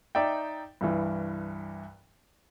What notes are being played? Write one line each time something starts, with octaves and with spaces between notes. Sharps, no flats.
D#4 D5 E5 G5
C2 G2 E3